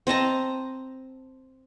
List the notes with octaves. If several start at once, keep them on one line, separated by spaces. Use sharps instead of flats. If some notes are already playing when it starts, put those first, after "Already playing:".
C4 D#5 A5 A#5